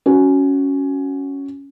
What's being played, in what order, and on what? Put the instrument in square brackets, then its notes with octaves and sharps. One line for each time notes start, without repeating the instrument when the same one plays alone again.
[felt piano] C#4 F#4